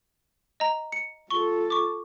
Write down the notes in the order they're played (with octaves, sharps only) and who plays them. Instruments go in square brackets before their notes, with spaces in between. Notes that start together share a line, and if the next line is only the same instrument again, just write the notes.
[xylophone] D#5 A#5
C#7
[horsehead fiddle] F4 A4 [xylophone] C#6 G7
[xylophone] C#6 D6